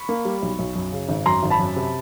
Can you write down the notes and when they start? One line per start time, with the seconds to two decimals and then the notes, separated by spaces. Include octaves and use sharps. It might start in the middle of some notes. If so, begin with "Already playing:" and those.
Already playing: B5 C#6
0.09 A#3
0.25 G3
0.42 B1
0.59 B1
0.75 F#2
0.92 C#3
1.09 G#1
1.26 F#2 A#5 C6
1.43 G#1
1.50 A5 B5
1.59 F#2
1.76 C3